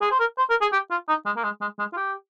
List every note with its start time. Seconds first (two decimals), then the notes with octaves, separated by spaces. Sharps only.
0.02 G#4
0.11 C5
0.19 A#4
0.38 C5
0.50 A#4
0.62 G#4
0.73 G4
0.91 F4
1.09 D#4
1.26 G#3
1.37 A#3
1.44 G#3
1.61 G#3
1.79 G#3
1.93 F4
1.97 G4